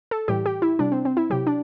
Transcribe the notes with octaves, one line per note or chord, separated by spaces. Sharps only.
A4
A2 E3 G3 G4
G4
E4
C3 G3 D4
C4
C4
E4
C3 F#3 G4
D4